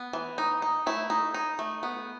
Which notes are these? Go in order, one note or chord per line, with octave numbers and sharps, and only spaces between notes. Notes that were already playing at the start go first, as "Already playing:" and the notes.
Already playing: B3
E3
D#4
D#4
A3 E4
D#4
D#4
A3
B3